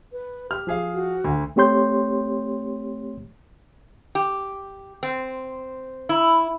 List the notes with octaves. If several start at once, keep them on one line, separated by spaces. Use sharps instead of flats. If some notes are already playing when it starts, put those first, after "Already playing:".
B4
G4 F6
F3 G#4 F5
F#4
D2
A3 C4 G4 C#5 C6 G6
G4
C4
E4